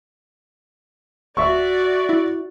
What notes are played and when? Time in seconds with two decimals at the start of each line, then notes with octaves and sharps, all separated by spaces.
1.37 D1 F#4 D5 E5 C#6
2.09 E4